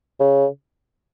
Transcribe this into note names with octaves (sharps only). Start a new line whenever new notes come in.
C#3